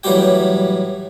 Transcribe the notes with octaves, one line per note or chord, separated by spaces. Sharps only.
A2 E3 F#3 G3 G4 G5